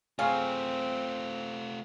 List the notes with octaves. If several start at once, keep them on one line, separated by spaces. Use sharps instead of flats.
F#3 A3 C4 F4 G#4 F5